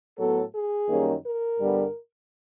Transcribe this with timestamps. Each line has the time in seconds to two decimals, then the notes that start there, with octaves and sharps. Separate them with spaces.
0.18 A2 F#3 B3 A4
0.53 G#4
0.89 F#2 D#3 G3 A#3 C#4
1.24 A#4
1.59 G2 D3 G3 B3